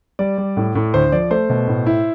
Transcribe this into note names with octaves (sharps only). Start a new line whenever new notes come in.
G3 D5
G3
A2
A2
D2 C5
F3 D5
A3 C5
B2
A2
E4